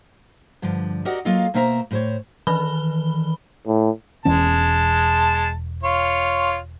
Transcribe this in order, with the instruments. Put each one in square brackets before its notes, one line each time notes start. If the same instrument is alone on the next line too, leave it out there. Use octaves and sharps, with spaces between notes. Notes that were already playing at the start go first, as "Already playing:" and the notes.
[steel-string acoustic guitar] G2 D3 F3
F#4 G4 A#4 D5 D#5 F#5
F#3 A#3 F4 A4 D#5 F5
B2 A#3 C5 E5 G#5 A#5
A2 C5 C#5
[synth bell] D#3 E3 B4 B5 G7
[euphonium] A2
[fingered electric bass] E1 E3 C#4 [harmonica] G#3 A5
[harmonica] F4 C#5